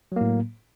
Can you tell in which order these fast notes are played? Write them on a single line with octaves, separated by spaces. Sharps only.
F#3 A#3 A2